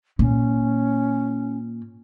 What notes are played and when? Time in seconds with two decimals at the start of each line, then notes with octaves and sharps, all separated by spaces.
0.19 A#2 C#4